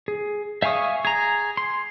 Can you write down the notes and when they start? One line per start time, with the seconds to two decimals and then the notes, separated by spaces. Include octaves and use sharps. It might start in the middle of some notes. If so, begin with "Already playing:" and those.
0.08 G#4
0.62 E5 F5 G#5 C#6 D#6
1.05 G#4 A#5
1.57 C6